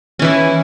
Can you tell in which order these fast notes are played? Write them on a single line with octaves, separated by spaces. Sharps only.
C#4 E3 E4